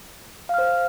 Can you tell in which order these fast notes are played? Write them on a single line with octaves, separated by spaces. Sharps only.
F5 F6 C5